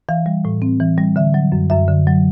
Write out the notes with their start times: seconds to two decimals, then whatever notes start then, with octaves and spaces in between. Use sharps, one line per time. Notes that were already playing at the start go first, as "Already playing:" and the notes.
0.09 E3 F5
0.26 G3
0.45 A2
0.62 C4
0.80 E3
0.98 G3
1.16 D3 E5
1.34 F#3
1.52 F#2
1.70 F#2 E5
1.88 D3
2.07 F#3